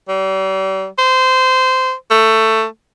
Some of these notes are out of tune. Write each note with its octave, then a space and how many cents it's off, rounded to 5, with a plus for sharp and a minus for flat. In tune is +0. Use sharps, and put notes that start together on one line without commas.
G3 -40
C5 -20
A3 +15